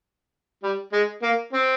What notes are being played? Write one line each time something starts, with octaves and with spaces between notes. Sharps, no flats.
G3
G#3
A#3
C4